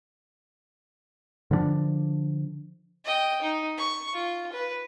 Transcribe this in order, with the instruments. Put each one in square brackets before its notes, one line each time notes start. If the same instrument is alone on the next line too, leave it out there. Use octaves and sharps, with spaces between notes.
[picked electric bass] D3 F3 B3 D4
[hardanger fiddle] D#5 G5
D#4
C#6
F4
B4